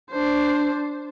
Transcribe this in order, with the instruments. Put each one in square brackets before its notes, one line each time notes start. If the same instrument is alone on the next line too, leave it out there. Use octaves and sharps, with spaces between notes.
[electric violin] D4 C5